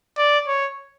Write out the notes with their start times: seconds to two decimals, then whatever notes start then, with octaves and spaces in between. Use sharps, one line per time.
0.17 D5
0.48 C#5